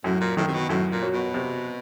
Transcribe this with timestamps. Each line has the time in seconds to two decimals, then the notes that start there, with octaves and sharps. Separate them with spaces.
0.04 F#2 A2
0.21 A#2
0.37 A2 D#3
0.47 C3
0.54 B2
0.69 F#2 A2
0.92 A#2
1.02 F#3
1.13 B2
1.34 C3